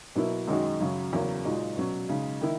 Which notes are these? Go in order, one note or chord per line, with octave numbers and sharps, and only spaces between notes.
B2 F#3 A#3 E4
F#2 D#3 G#3 D#4 F#4
F#2 C#3 F#3 C#4
E2 C#3 F#3 A#3
A#2 G#3 D#4 F#4
B2 F#3 C#4
C#3 G#3 D#4
D#3 A#3 E4